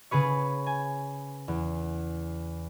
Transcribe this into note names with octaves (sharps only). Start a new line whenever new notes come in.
C#3 G#4 B4 C#5
G#5
E2